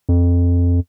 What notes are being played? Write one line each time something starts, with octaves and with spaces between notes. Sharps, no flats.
F2